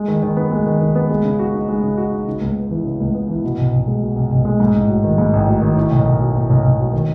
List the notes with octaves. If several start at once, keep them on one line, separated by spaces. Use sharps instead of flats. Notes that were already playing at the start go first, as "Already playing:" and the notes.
Already playing: G#3
D#3
D#3
B3
G#3
D#3
D#3
B3
G#3
C#3
F#4
D#4
G#3
C#3
F#4
D#4
C#3
C#2
B3
E3
C#3
C#2
B3
E3
B2
B1
B1
G#3
B2
B1
B1
G#3
G#2
A1
F#3
D#3
G#2
A1
F#3
D#3
A2
B1
B1
F#3
A2
B1
B1
F#3
D#3